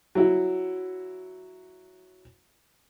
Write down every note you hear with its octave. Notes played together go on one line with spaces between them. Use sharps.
F#3 E4 F#4